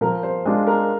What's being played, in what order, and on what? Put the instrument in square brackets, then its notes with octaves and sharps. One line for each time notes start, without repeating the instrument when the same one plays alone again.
[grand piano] F3 [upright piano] A#4
[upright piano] C5
[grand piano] G#3 D4 F4
[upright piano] A#4